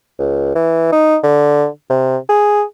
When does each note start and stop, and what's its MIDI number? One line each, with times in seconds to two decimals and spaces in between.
0.19 0.54 37
0.55 0.90 52
0.92 1.17 63
1.23 1.67 50
1.90 2.17 48
2.29 2.63 68